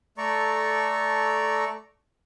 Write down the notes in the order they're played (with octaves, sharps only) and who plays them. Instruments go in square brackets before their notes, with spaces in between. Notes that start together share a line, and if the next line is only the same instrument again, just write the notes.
[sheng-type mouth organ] A3 A4 D5 A#5 C#6